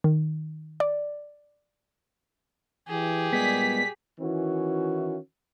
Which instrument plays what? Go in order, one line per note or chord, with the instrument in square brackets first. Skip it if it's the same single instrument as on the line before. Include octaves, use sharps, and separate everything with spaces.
[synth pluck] D#3
D5
[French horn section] E3 [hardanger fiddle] G4 G#4
[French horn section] A#2 G3 [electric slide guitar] G#3 B3 [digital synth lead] B6
[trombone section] D#3 E3 C#4 E4 F#4